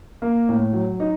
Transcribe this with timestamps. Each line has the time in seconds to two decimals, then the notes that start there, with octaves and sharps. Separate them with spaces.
0.22 A#3
0.49 A2
0.73 F#3
1.00 D#4